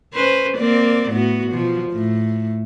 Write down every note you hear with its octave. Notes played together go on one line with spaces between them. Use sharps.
C#4 B4 C5
A#3 C4 D5
A2 B3 F#4
B2 F3
A2